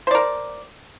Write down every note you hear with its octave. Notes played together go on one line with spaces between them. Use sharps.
A#4 C5 D5